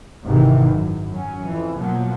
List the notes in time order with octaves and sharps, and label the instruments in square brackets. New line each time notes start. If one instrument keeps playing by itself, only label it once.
[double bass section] G#1 C3 D#3 E3
F#2
F#3 C#4
F2 E3
B2 F3 F#3 A#3